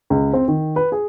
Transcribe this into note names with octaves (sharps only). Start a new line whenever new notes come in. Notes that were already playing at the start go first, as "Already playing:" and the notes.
C#2
C4
D#3
B4
G#4